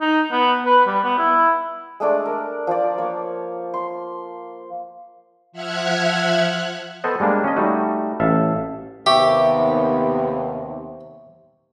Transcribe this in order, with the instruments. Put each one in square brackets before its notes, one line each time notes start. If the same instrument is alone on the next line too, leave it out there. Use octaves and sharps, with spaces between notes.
[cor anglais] D#4
B3
B4
G3
B3
E4
[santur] G#3 A3 D4 D5
A#4
F3 D5
A#3 C#5
C6
[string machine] F3 E5 F#5 F6 F#6 G#6
[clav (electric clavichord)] B3 A4 C5 D#5 F#5
G3 G#3 A#3 D4
C#4 D#5
G3 A3 D#4 F#4
A1 A4 E5 F5
[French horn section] D#2 C3 [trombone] B3 [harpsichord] G4 [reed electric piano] E5 C#6